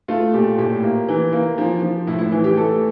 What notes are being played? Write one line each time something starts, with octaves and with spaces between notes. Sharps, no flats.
A3 F4
A#2 G4
A2 G4
A#3
E3
A#3
F3
F3
A2 E4
E4
E3
G4
A3 A4